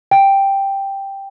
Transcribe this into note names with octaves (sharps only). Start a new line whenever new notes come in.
G5